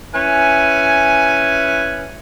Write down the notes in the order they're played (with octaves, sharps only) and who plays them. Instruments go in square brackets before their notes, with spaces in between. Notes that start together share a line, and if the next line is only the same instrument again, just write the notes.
[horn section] C#4 E4 B4 G#5